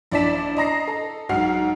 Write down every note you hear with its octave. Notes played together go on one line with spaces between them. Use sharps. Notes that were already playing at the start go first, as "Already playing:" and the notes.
A#1 E4 D5 A5 B6 E7
D#5 A#5 A#6 C7
A4
B1 G#2 F#4 F6 C7